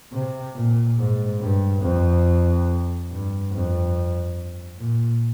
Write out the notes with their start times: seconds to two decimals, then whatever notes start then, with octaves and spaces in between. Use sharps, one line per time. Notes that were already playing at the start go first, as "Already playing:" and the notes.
0.12 C3
0.54 A#2
0.97 G#2
1.40 G2
1.81 F2
3.09 G2
3.52 F2
4.79 A#2